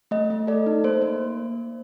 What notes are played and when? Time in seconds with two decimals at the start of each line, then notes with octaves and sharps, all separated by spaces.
0.11 A3 D#5
0.30 A3
0.47 A4 D5
0.66 D#4
0.84 A#3 C5
1.02 A#3